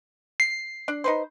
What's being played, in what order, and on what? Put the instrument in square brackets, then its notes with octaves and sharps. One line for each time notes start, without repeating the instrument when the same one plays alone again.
[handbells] C7
[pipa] D4
D#4 B4 C5